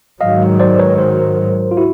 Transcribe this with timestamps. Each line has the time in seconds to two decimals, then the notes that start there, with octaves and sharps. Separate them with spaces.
0.20 G#2 D#3 F#3 D#5 F5
0.60 C5 D5
0.79 B4 C#5
0.98 A#4 C5
1.71 F4
1.77 E4 F#4